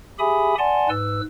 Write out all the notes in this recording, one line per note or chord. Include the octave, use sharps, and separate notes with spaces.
G4 G#4 E5 G#5 B5 D#6
D5 F#5 G#5 A5 C6
G#2 B4 E6